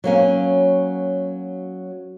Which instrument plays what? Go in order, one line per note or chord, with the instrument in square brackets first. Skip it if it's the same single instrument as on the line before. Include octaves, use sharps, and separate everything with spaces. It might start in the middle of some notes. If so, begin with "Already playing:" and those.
[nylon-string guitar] F#3 A#3 C#4